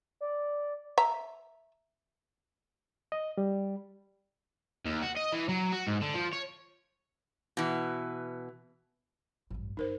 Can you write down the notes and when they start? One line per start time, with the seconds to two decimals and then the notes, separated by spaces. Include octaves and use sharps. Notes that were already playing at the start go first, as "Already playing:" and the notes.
0.21 D5
0.98 E5 A#5
3.12 D#5
3.38 G3
4.86 D#2
5.02 F#4
5.17 D#5
5.33 E3
5.49 F#3
5.72 F#4
5.87 G#2
6.01 D3
6.14 F3
6.33 C#5
7.57 B2 E3
9.50 A1 G2
9.77 G1 D#4 A#4 C5